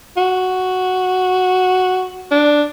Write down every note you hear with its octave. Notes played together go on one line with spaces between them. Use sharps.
F#4
D4